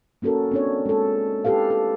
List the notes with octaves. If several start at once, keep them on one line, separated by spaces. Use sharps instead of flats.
A#3 C#4 F#4 A4 A#4
C4 D4 C#5
G#3 A4
E4 F4 G4 A4 B4 F5
A4